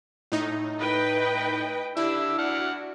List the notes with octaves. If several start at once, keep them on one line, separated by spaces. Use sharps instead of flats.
A2 D#4
B4 D#5 G5
D4 E4 G4 E6
D4 F#4 F#5 F6